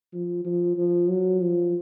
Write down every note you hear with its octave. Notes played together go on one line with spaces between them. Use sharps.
F3
F3
F3
F#3
F3